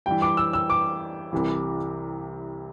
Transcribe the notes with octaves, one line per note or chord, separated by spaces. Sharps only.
G2 E3 G5
D6
E6
E6
D6
C2 C3 E3